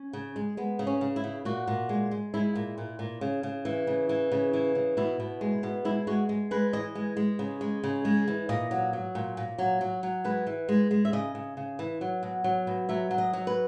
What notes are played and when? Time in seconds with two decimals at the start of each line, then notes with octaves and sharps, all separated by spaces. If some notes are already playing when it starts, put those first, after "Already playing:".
Already playing: C#4
0.13 C#3
0.36 G#3
0.57 G#3 B3
0.79 C#3
0.87 C#4
1.01 C#3
1.16 E4
1.24 C#3
1.45 A#2 F#4
1.68 A#2
1.89 G#3
2.11 G#3
2.34 G#3 E4
2.56 A#2
2.78 A#2
2.99 A#2
3.21 C#3
3.43 C#3
3.65 E3
3.87 C#3
4.09 E3
4.32 C#3
4.53 E3
4.75 C#3
4.97 B2 E4
5.20 B2
5.41 G#3
5.63 B2
5.85 G#3 E4
6.07 G#3 F#4
6.29 G#3
6.51 G#3 B4
6.73 E3 D#5
6.95 G#3
7.17 G#3
7.39 C#3
7.61 G#3
7.84 C#3
8.05 G#3
8.28 E3
8.49 A#2 D#5
8.71 F#3
8.93 F#3
9.15 A#2
9.37 A#2
9.58 F#3
9.81 F#3
10.03 F#3
10.24 G#3 B4
10.47 E3
10.69 G#3
10.91 G#3
11.05 E5
11.13 C#3 D#5
11.35 C#3
11.57 C#3
11.79 E3
12.01 F#3
12.23 B2
12.44 F#3
12.67 B2
12.89 F#3 E5
13.11 F#3
13.18 D#5
13.33 F#3
13.47 B4